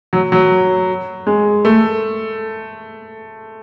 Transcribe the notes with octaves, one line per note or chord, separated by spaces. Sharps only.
F#3
F#3
G#3
A3